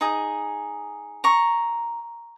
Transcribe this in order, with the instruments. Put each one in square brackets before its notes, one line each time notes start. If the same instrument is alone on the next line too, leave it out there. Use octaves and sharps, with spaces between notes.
[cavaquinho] D#4 G#4
A#5 C#6